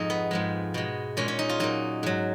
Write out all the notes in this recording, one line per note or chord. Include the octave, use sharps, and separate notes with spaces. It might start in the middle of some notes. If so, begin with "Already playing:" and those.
Already playing: F2 G#2 G#3 D#4
B3
G#2 F3 G#3
B2 G#3
A#2 G#3 C#4
C#4
D#4
F4
A#2 F#3 D#4
G#2 F#3